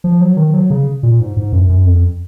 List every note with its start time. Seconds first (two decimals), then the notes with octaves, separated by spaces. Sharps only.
0.04 F3
0.21 F#3
0.37 D#3
0.54 F#3
0.70 C#3
1.03 A#2
1.20 G#2
1.37 G#2
1.53 F#2
1.69 F#2
1.86 F2